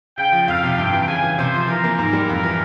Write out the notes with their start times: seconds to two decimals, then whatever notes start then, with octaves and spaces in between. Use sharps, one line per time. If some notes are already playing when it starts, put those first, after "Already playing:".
0.18 C#3 G5
0.32 F3
0.48 F2 F5
0.63 C3
0.78 G2 G5
0.93 E3
1.08 C#3 G#5
1.23 E3
1.38 C3 C5
1.54 F3
1.68 E3 A#4
1.84 A#3
1.99 G#2
2.13 G3
2.29 F2
2.43 E3